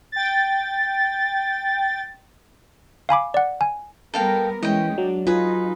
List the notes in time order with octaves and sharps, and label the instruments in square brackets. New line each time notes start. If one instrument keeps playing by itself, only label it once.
[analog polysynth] G5 A6
[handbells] F5 G#5 B5 D6
D5 F#5
G#5
[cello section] G3 B3 A#4 [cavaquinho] A4 F5 G5
[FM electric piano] E3 [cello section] G#3 C#4 [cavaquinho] D#5 G5
[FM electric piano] F#3 [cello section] D4
[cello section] D#4 [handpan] F4 [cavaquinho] G#4 B4